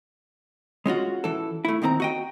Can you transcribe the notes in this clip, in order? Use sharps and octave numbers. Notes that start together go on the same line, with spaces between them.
G#3 C#4 F4 F#4
E3 A4
A3 E4
E2 D#3 C4 D5 A#5
F#4 D#5 G5